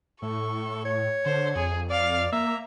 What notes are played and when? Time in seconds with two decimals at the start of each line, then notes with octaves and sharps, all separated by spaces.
0.22 A2 A4 C#6
0.85 C#5
1.26 D3 C5
1.56 F2 G#4
1.90 D5 F5
2.32 A#3 E5 A#5